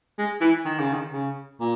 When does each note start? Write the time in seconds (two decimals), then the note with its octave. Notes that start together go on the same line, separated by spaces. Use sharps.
0.18 G#3
0.41 E3
0.65 D#3
0.80 C#3
0.93 D#3
1.13 C#3
1.61 A#2